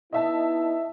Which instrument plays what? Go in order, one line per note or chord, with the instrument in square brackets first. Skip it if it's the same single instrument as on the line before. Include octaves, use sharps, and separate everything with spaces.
[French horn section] B3 D#4 E4 [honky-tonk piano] D#5 E5 A5